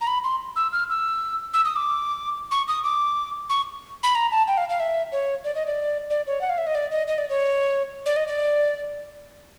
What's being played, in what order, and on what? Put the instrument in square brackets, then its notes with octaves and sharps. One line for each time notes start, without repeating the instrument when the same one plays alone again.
[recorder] A#5
B5
C6
E6
F6
E6
E6
D#6
D6
C#6
D#6
D6
C#6
B5
A#5
A5
G5
F5
F5
E5
C#5
D5
D#5
D5
D5
C#5
F#5
F5
E5
D#5
D5
D#5
D#5
D5
C#5
D5
D#5
D5